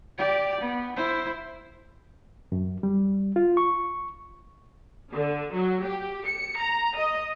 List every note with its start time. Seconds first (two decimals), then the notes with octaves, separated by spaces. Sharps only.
0.18 G4 D5
0.60 B3
0.96 E4 C5
2.52 F#2
2.83 G3
3.36 F4
3.57 C#6
5.13 D3
5.54 F#3
5.86 G4
6.27 C#7
6.60 A#5
6.97 D#5